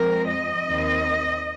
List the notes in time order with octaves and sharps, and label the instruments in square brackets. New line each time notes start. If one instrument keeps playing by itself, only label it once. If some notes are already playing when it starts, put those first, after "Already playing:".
Already playing: [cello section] F2 F3 G#3 C4 A#4
D#5
D#2 D#3 C4